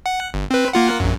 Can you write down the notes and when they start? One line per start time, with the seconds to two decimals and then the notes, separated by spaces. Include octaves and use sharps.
0.06 F#5
0.34 G1
0.51 C4 B4
0.73 A#3 F4 F#5
1.00 A#1 F#2